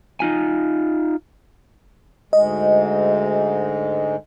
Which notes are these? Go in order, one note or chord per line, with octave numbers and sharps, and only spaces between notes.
D#4 F4 G#5
D2 G#2 G#3 D#5